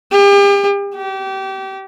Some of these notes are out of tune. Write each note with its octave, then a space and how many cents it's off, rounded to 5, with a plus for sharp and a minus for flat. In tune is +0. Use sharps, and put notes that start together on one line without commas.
G4 +40
G4 -25